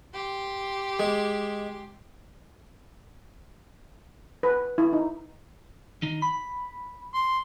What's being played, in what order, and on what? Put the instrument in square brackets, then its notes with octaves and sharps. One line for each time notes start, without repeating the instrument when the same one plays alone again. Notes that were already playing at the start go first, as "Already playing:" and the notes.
[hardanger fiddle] G4 C6
[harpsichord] G#3
[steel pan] B4
E4
D#4
[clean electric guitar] D#3 D#4
B5
[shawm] C6